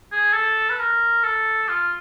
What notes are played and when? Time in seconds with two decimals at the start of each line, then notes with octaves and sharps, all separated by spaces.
0.12 G#4
0.33 A4
0.69 B4
0.79 A#4
1.23 A4
1.68 F4